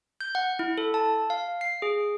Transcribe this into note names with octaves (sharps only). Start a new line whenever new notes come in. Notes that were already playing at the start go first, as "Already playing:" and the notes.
G6
F#5
E4
A4
A5
F5
C7
G#4